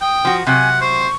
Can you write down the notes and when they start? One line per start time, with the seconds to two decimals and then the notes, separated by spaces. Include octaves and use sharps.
0.01 G5 D#6
0.25 F3 F#4
0.47 C3 F#3 F#5 G#5
0.81 C5 C#6